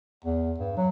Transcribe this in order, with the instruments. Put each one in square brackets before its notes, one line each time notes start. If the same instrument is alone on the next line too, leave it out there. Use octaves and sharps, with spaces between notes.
[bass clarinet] E2
G2
F#3